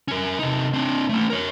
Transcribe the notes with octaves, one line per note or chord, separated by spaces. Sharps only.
C#4 A#4
C3 D#4
C4 D4
A3 C#4
A#4 C#5